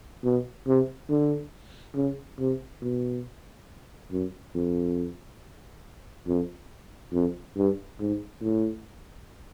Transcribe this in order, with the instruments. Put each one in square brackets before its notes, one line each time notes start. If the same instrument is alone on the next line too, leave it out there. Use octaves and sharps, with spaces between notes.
[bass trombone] B2
C3
D3
C#3
C3
B2
F#2
F2
F2
F2
G2
G#2
A2